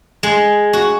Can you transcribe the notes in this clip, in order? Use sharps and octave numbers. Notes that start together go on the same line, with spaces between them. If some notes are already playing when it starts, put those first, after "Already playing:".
G#3
F#4